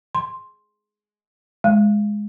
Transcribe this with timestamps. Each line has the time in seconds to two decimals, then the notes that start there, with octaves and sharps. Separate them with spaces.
0.15 C6
1.64 G#3